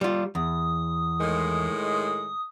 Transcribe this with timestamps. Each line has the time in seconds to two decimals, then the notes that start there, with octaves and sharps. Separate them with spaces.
0.01 G3 F4
0.35 E2 D#6
1.21 A2 D#3 G#3